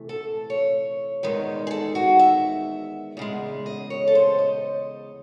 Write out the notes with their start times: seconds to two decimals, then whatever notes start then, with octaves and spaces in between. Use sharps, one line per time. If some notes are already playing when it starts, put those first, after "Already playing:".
Already playing: C3 E3 A3
0.09 A4
0.50 C#5
1.23 E2 D#3 G#3 D#4
1.67 G#4
1.71 A4
1.95 F#4
2.19 E5
3.17 E2 C#3 G#3
3.66 D#5
3.90 C#5
4.08 A4
4.15 C5
4.39 D#5